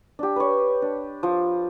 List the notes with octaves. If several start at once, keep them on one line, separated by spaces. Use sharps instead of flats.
D4 G4
B4 C#5
D4
F3